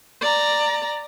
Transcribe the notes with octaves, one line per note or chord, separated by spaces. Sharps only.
D5 A#5